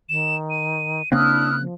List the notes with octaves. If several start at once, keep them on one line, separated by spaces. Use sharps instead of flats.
D#3 E7
D#7
C#3 A#3 C4 D4 E4 D#6 F6 F#6
F3